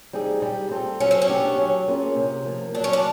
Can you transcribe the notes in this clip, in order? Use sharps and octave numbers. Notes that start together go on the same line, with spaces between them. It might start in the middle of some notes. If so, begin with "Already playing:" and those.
G3 C4 D#4 G#4
G3
C4 F4 A4
F#3 C#4
C4
C#4
B3 D4 G4
F#3
A#3 C#4 F4 G#4
C3
F3 A#3
F#3 D4
C#4
D4